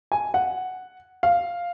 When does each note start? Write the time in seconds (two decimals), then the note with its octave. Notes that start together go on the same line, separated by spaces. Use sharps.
0.12 G#5
0.34 F#5
1.23 F5